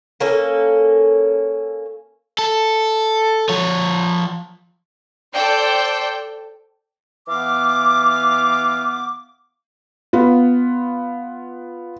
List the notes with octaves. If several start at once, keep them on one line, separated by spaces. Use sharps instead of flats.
A#3 C#4 A4
A4
F3 C#5
A4 C5 D5 G5
E3 B3 F5 D6
B3 F4